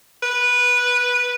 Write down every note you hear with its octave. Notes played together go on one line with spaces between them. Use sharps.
B4